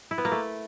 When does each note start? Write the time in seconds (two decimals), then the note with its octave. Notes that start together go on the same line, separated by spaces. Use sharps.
0.11 E4
0.18 B3
0.25 A#3
0.32 A3